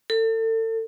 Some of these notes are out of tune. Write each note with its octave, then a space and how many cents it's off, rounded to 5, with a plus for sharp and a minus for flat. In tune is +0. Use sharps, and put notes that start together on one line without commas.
A4 +35